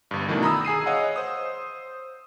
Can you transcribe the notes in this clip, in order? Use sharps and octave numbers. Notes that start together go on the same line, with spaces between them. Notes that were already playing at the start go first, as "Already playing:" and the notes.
G1 G2
B2 D#3 E3 A3 D4
A#5 B5 D#6 E6
G#4 G#5 C7 D#7
C#5 D#5 F5 F#5
C5 D#6